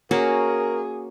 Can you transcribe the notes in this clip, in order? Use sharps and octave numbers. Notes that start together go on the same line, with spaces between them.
A#3 C#4 F#4 G#4 A#4